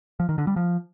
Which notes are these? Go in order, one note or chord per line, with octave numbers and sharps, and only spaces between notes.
F3
D#3
D3
G3
F3